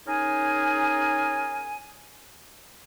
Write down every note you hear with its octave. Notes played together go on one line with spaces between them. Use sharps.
C#4 D#4 G#4 A#4 G#5